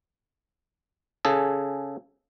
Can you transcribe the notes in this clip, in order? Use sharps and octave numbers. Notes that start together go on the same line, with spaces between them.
C#3 G#4 A4